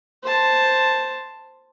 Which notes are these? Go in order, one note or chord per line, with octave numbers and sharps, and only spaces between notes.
C5 A5